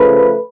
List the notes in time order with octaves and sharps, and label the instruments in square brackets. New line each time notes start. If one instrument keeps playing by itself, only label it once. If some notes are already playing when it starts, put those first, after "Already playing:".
Already playing: [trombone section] C#3 F3 A3 B4